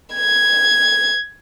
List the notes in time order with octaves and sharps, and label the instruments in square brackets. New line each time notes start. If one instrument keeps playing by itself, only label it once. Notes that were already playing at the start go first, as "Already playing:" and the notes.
[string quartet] G#6